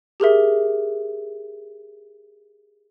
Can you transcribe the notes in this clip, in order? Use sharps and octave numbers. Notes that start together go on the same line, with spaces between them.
G4 G#4 A#4 E5